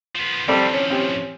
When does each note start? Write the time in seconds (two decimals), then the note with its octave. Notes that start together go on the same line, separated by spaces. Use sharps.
0.15 F3 B3
0.48 A2 F3 G3 C4 A4 G5
0.74 C#4
0.90 C4 G4